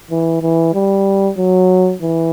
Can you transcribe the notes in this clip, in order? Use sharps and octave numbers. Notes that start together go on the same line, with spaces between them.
E3
E3
G3
F#3
E3